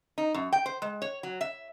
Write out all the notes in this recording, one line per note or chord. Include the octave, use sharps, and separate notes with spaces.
D#4
F#2
G5
C5
G#3
C#5
F#3
E5